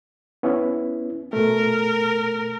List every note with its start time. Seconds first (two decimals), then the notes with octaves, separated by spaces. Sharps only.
0.43 B3 C#4 E4
1.33 B2 A3 A#4